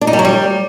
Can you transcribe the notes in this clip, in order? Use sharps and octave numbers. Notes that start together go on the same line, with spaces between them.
D4
D#4
G3
F#3
G3